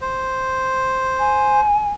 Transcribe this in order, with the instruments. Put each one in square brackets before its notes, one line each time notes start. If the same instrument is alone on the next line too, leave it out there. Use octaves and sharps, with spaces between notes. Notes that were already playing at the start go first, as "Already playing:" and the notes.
[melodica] C5
[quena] G#5